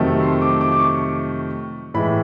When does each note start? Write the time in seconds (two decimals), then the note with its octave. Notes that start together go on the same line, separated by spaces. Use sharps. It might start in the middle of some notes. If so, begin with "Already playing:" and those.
Already playing: F2 C3 D#3 F#3 A3
0.23 C6
0.42 D6
0.61 D6
0.72 D6
0.80 C#6
1.94 A2 E3 G#3 B5